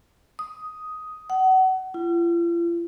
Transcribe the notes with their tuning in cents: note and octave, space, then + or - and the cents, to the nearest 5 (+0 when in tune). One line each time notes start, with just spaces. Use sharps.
D#6 +5
F#5 +30
F4 -45